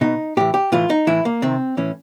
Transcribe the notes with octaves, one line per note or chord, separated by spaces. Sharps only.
B2 D#4
A2 E3 G4
G4
A2 E3 F4
D#4
A2 E3 E4
A#3
C3 D#3 C4
A2 E3 C#4